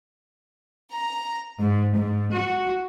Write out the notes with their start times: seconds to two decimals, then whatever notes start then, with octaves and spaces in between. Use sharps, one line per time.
0.93 A#5
1.59 G#2
1.95 G#2
2.33 F#4